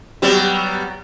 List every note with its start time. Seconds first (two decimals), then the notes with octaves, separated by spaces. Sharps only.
0.22 F#3 G3 B3